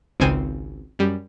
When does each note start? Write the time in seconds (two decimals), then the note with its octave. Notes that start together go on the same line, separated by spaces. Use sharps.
0.20 G#1 C#2 C#3 C4 G#5 D#7
0.99 F#2 G3